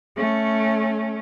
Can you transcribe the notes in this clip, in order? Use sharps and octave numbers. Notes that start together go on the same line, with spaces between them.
A3 C#4